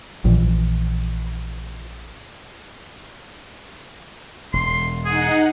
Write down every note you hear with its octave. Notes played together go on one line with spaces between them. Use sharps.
A#1 A#2 E3
E1 C6
D#4 G#4 F#5